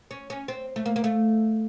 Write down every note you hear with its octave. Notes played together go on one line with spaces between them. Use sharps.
C#4
C#4
C4
A3
A#3
A#3
A3